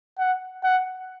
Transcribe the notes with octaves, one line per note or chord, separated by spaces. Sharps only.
F#5
F#5